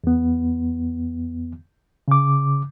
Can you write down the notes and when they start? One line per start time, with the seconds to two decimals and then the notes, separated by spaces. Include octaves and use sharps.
0.04 E2 B3
2.08 C#3 D6